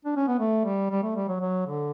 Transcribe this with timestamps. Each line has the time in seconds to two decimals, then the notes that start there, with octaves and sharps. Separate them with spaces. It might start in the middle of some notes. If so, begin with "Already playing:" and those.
0.05 D4
0.16 C#4
0.27 B3
0.39 A3
0.65 G3
0.90 G3
1.03 A3
1.16 G3
1.29 F#3
1.41 F#3
1.66 D3